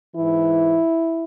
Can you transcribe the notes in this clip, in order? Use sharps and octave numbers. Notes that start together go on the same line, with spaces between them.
G#2 E3 E4